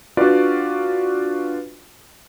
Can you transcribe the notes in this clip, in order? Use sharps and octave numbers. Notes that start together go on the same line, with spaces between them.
D4 F4 F#4 B4 D5